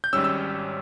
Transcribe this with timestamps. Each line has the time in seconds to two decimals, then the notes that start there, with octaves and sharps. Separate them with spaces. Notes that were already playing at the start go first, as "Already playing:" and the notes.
0.04 G6
0.13 G#1 G#2 G3 C#4 E6
0.24 E6